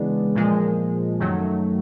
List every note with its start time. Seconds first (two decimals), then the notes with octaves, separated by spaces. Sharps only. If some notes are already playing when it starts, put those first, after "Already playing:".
Already playing: C#3 E3 G#3 B3 D4
0.35 A#2 F3 G#3
1.20 F#2 D#3 F#3 A3